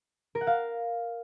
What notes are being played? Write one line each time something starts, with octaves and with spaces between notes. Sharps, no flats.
A#4
F#5
F5